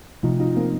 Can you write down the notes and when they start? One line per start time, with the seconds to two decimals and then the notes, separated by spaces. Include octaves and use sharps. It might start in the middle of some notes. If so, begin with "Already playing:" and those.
0.23 C3 F3 A3 D#4 F4
0.40 D#4 F4
0.56 A#3 C4